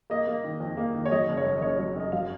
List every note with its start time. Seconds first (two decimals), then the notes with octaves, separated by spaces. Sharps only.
0.10 A#3 D#5
0.27 A#3
0.44 D#3
0.60 F2
0.77 A#3
0.95 D#3
1.05 C#5
1.11 F#3 D#5
1.29 F#1
1.37 C#5
1.45 F#2
1.58 D#5
1.62 F#1 C#5
1.75 F#3 C#5
1.96 F#2 D#5
2.12 F#3 F5